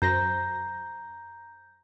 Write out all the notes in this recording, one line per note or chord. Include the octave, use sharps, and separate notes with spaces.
F#2 C5 A#5 G6 A#6